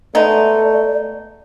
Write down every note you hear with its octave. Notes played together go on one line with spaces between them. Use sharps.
G#3 A3 B3 D#4 D5